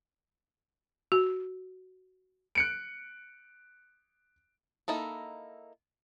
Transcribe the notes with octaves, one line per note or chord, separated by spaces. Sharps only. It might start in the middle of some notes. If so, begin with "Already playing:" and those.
F#4
F#6 C#7 D7
A#3 D#4 E4 A4